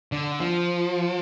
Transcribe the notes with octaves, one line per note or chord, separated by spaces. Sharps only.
D3
F3